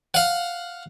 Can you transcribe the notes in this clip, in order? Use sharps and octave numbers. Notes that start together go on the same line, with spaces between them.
F5 F#5